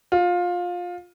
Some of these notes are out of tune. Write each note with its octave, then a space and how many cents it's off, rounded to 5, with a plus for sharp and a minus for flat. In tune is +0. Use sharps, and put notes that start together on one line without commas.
F4 +20